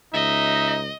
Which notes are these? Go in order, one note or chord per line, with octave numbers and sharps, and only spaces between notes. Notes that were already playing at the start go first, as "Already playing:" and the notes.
C#2 D#4 D#5 E5